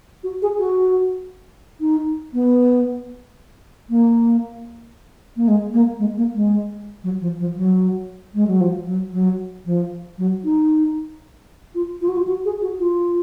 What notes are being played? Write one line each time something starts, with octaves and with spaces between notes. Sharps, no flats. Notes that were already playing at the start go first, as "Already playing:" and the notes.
F#4
G#4
F#4
D#4
B3
A#3
A#3
G#3
A#3
G#3
A#3
G#3
F#3
F3
F3
F#3
G#3
F#3
F3
F#3
F#3
F3
F#3
D#4
F4
F4
F#4
F4
F#4
G#4
F#4
F4